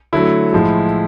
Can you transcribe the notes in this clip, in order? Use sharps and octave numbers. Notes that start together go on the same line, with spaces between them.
D3 F#3 A3 E4
A2 F3 G#3